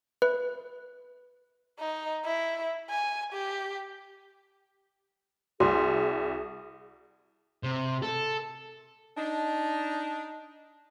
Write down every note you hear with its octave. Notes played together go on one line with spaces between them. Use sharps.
B4
D#4
E4
G#5
G4
C2 F#4 G#4
C3
A4
D4 D#4